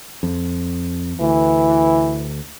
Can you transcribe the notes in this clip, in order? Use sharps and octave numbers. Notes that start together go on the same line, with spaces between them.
F2
D2 E3